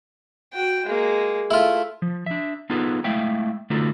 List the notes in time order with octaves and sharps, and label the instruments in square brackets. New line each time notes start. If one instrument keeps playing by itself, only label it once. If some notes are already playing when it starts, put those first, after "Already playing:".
[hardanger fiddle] F#4 G5
G#3 A#3
[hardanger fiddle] A3 [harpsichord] E4 F4
[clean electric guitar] F3
D4 E5
B3 D#4 F4 G#4 A4 B4
G#3 A3 E4 E5 F5 G5
D3 A3 D#4 F4 F#4 A4